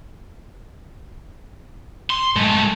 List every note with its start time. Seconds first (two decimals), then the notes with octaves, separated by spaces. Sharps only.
2.10 C6
2.36 G#3 A3